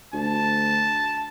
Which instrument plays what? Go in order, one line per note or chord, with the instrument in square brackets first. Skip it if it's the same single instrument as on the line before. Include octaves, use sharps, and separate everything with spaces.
[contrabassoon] D2 [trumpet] A5